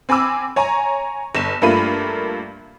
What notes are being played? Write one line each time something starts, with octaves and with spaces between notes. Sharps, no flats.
C4 G#5 B5 D6 E6
C#5 G#5 A#5
G1 E7
G2 A3 A#3 F4 B5 D#7